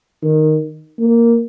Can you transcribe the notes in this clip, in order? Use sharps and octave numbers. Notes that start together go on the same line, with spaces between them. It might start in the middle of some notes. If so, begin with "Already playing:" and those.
D#3
A#3